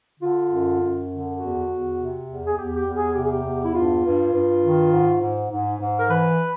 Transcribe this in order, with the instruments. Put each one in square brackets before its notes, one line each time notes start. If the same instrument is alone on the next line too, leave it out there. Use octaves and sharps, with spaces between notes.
[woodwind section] D3 F4
F#2
F#2
D3
E2 F#4
E2
C3
E2
G#4
E2 G4
G4
E2
G#4
C3 G4
G#4
G4
E2
E4
G2 F4
G2
G2
D#3
G#2
G#2
G#2
G#2
A#4
E3 B4